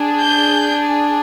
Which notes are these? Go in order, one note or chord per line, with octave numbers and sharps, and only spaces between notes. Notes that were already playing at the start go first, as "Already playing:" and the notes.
Already playing: D4 G#4
G6